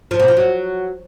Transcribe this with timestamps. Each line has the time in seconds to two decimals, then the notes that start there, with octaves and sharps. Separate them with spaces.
0.11 F3
0.20 B2
0.28 F3
0.37 F#3